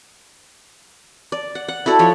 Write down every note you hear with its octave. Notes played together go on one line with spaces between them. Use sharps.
D5
F#5
F#5
E4 F#4 A4 D5
F3 C#5